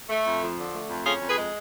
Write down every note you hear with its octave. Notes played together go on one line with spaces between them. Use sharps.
A3
F2
F3
D3
A3
F2
C#4 F4 G#4
F2
G#4 B4
G#3